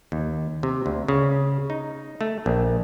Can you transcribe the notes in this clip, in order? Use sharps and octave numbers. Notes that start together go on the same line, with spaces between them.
D#2
C3
D2
C#3
D#4
A3
A#1